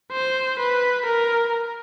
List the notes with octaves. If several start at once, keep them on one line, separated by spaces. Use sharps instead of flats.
C5
B4
A#4